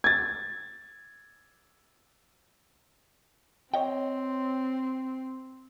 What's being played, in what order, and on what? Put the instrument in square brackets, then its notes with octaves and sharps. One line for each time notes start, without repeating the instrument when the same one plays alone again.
[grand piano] G#6 A6
[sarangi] C4 [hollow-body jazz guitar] C#5 D#5 G5